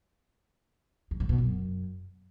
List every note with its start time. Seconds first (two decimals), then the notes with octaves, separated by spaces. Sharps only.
1.11 G2
1.20 G#2
1.29 B2
1.38 F#2